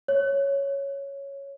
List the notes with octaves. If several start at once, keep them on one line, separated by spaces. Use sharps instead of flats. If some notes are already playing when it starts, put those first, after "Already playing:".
C#5